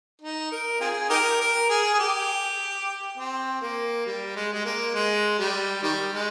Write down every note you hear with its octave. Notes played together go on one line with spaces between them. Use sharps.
D#4
A#4
C4 F4 G#4
D#4 G4 A#4
A#4
G#4
G#4
G4
C4
A#3
G3
G#3
G#3
A#3
G#3
G3
D#3 G3
G#3